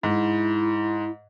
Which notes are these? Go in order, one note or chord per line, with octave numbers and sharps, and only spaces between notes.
G#2 E4